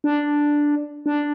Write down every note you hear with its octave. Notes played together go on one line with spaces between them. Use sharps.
D4
D4